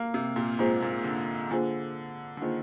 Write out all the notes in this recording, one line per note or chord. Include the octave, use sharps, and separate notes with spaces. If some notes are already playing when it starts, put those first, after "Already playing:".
Already playing: A#3
C3
A#2
G#2 A#3 F4 G#4 C5
A#2
D3
D3 A#3 F4 G#4 C5
D3
D#3 A#3 F4 G#4 C5